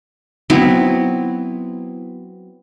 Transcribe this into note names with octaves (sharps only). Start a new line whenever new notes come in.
F#3 B3 C4 E4